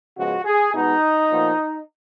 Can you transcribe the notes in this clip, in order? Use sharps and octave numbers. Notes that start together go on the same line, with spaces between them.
C#3 F3 G#3 B3 F#4
G#4
B2 G#3 B3 D#4
A#2 F3 B3